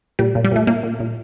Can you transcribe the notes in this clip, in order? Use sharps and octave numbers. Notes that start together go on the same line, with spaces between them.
A#2 G3
A#2
G3
A#2 A3
A#2 A#3
A#2
A#2